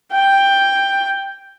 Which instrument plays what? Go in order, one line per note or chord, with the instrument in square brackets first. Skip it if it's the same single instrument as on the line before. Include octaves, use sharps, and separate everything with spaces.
[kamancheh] G5